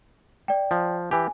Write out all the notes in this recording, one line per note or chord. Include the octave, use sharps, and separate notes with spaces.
D5 G5
F3
E3 G4 G#5